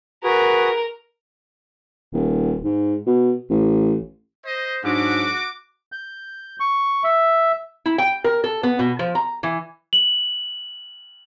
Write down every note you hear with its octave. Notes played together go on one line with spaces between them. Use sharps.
F#4 G#4 A#4 B4
D#1
G#2
B2
A1
C5 D#5
G#2 F#3 D4 F#4 D6
G6
C#6
E5
E4
G5
A#4
A4
B3
B2
F3
A#5
E3
F#7